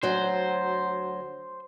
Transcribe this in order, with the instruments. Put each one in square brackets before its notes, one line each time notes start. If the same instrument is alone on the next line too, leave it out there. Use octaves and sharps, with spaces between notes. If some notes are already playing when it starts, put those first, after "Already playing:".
[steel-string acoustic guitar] D2 F#3 [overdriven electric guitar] C5